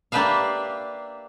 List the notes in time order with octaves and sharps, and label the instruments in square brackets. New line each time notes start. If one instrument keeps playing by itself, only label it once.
[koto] A#3 D4 G4 B4 E5 F5